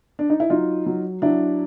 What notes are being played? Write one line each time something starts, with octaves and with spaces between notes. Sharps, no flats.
D4
D#4
E4
F#3 D#4 F4
F#3
F#3 D4 E4